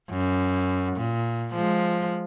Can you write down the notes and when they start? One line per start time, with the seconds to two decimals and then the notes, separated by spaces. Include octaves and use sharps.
0.10 F#2
0.96 A#2
1.55 F3 G#3